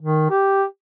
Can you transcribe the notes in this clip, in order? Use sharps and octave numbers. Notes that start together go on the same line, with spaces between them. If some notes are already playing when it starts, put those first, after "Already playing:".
D#3
G4